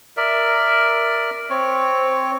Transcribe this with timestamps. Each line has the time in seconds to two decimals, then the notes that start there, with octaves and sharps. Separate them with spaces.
0.17 A#4 D5 E5
1.50 C4 C#5